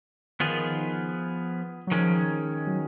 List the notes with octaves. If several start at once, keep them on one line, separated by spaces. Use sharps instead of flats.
D#3 F3 B3 F4 G#4
F#3
D#3 F3 G#3 C#4
F#3